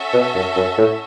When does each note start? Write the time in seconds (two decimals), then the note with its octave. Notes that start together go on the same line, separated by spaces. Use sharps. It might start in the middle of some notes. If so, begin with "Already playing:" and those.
Already playing: C#4 F#4 A4 E5 A5
0.14 B2
0.35 F#2
0.57 F#2
0.78 A2